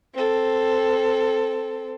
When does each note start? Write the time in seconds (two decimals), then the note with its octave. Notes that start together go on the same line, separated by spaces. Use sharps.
0.14 C4 A4